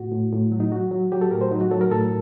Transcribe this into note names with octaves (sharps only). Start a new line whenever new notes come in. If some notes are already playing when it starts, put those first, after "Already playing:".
Already playing: A2 F#4
A2
A2
F#3
D#4
F#3 F#4
F#3
F#3 G4
A4
A2 A#4
C5
F#3 D#4
F#4
F#3 A4
A#4
A2 A4